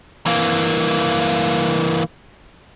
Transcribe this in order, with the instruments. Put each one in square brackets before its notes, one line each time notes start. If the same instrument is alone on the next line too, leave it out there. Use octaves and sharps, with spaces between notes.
[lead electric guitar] E3 A#3